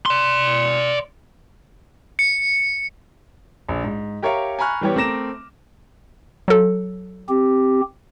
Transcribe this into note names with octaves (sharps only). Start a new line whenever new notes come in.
D5 C6
C#7
A#1
G#2
G4 A#4 C#5 E5 F5 C#6
G#5 A#5 B5 C#6 F6 F#6
E3 G3 B3 G4 C#5
A3 C4 A#4 D6 A#6 E7
F#3 A4
C4 G4